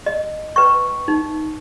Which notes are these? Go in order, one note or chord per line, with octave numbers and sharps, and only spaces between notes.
D#5
B4 G5 C#6
D#4